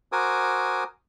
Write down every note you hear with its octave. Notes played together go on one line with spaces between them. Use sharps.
F#4 A#4 C5 G#5 D6 D#6